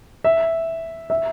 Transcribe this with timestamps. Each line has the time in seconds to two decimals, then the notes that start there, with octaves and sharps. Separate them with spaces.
0.24 E5
1.10 E5